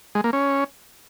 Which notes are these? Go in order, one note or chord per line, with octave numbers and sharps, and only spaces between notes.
G#3
A#3
C#4